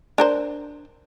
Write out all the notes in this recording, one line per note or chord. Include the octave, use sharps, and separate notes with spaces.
D4 A#4 C5